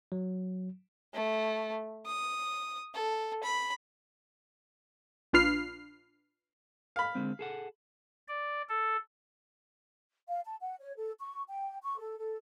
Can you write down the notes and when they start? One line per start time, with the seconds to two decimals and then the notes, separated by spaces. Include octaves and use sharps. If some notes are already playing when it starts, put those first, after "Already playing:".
0.12 F#3
1.14 A3
2.06 D#6
2.94 A4
3.43 B5
5.33 A#1 D4 F4 B4 F6 C7
6.96 F5 B5
7.15 D3 G#3 C4
7.39 G#4 A4 F#5
8.28 D5
8.69 A4
10.28 F5
10.45 A5
10.60 F#5
10.80 C#5
10.97 A4
11.19 C#6
11.48 G5
11.82 C#6
11.99 A4
12.18 A4